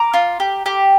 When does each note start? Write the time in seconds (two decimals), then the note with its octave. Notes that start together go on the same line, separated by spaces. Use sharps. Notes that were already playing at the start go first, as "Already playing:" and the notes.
Already playing: A#5 D6
0.14 F4
0.40 G4
0.66 G4